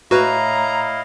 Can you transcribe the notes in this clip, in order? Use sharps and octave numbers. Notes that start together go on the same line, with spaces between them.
A2 E4 F#4 B4 D#5 F5 A#5